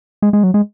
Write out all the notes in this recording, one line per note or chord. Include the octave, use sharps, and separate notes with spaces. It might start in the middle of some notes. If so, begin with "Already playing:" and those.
G#3
G#3
F#3
G#3